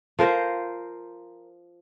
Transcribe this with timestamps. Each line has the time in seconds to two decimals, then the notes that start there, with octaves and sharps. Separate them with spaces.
0.19 F3 A#4 C5